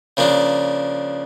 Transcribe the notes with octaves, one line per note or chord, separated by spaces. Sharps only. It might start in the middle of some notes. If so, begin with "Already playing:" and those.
C#3 F3 A#3 D4